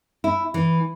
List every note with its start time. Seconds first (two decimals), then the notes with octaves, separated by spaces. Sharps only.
0.24 E4
0.54 E3